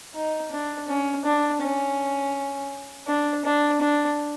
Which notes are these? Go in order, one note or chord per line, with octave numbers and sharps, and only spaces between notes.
D#4
D4
C#4
D4
C#4
D4
D4
D4